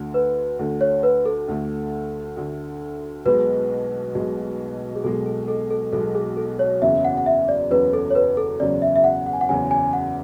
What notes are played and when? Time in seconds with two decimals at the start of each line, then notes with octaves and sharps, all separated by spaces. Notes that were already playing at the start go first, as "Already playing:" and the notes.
Already playing: D2 D3 A3
0.14 B4
0.59 D2 D3 A3
0.81 C#5
1.03 B4
1.26 A4
1.48 D2 D3 A3
2.37 D2 D3 A3
3.25 B1 B2 G#3 B4
4.15 B1 B2 G#3
4.96 G#4
5.04 B1 B2 G#3 A4
5.26 A4
5.48 A4
5.70 A4
5.92 B1 B2 G#3 A4
6.15 G#4
6.37 A4
6.59 C#5
6.82 F#1 E2 C#3 F#3 E5
7.05 F#5
7.17 F#5
7.26 E5
7.49 D5
7.71 F#1 E2 C#3 F#3 B4
7.93 A4
8.11 C#5
8.15 B4
8.37 A4
8.60 F#1 E2 C#3 F#3 D5
8.82 E5
8.96 E5
9.04 F#5
9.26 F#5
9.33 G#5
9.41 F#5
9.49 F#1 E2 C#3 F#3 G#5
9.71 G#5
9.93 F#5